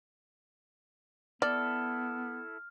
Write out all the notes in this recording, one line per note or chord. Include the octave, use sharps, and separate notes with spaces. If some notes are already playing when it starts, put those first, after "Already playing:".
B3 E4 A4 D5 F6